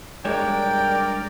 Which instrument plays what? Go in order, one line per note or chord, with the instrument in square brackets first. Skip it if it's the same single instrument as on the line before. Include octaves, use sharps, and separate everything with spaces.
[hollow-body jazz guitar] G2 G#3 C#5 [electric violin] A#4 D5 [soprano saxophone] G5